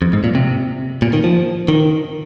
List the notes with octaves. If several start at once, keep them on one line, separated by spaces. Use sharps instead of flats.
F2
G#2
A#2
C3
A#2
D#3
F3
D#3